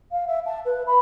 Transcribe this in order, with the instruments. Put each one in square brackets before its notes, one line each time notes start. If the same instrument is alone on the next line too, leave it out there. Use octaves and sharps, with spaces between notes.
[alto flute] F5
E5
A5
B4
B5